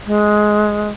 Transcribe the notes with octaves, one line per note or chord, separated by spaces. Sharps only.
G#3